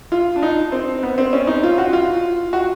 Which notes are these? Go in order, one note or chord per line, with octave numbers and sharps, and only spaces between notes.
F4
D4
D#4
C4
B3
C4
C#4
D#4
F4
F#4
F4
F#4